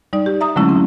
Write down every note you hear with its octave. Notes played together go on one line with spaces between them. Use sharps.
G3 D#4 D5
G4
E5 A#5 D#6
D3 F#3 G#3 A3 C#4 E4
C4